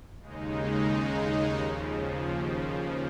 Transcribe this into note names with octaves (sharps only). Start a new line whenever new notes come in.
D#2 C#3 G#3 D#4
D#2 C#3 F3